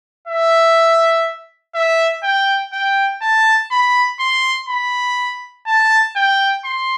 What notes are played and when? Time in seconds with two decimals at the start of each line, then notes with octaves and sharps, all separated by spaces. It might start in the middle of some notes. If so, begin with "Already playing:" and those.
0.28 E5
1.75 E5
2.23 G5
2.73 G5
3.22 A5
3.71 B5
4.20 C6
4.69 B5
5.66 A5
6.16 G5
6.65 C6